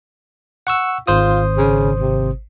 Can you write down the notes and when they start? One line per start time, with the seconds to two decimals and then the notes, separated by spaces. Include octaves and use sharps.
0.67 F#5 C#6 E6
1.07 G#1 F4 C5 D#6
1.57 C#3
2.00 C3